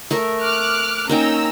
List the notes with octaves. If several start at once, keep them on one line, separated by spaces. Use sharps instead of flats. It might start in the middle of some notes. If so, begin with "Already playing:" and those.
A3 A#4 E5
D6 F6 F#6
A#3 C#4 D#4 G5 A#5 E6